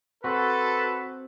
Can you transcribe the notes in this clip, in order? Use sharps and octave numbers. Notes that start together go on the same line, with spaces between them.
C4 F#4 A4 B4